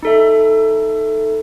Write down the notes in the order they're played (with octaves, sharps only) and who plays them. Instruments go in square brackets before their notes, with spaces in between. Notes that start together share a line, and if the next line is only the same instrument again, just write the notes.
[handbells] D#4 A4 E5